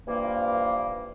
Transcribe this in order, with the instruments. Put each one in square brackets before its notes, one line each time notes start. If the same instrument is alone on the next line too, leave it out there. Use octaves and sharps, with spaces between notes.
[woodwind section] G2 E3 F3 A#3